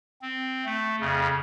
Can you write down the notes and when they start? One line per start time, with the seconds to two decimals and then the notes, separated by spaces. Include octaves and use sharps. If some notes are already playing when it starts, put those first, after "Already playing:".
0.22 C4
0.65 A3
1.00 F2 C#3